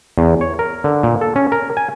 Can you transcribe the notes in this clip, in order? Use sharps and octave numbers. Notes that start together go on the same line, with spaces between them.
E2
C#5
A#4
D3
A#2
A4
C#4
A#4
G#5